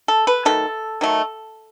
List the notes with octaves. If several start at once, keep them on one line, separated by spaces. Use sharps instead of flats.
A4
B4
D#3 F#3 A3 A4
D#3 F#3 A3